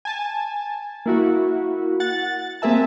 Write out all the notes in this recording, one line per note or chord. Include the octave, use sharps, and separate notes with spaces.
G#5 A5
A#3 E4 F#4
F#5 A6
A#3 C4 G#4 A#4 E5 A5